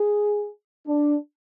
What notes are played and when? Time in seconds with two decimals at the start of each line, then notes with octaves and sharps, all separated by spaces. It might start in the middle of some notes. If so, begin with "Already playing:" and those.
Already playing: G#4
0.86 D4